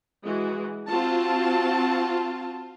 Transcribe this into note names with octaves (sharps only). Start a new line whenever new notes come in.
E3 G#3 F#4
C4 F4 F#4 A5